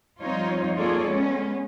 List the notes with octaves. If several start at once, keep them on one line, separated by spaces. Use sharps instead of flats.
F3 G3 C4 D#4 F4 C#5
A#3 F4 G#4 A4 C#5 D5
G#3 B3 C#4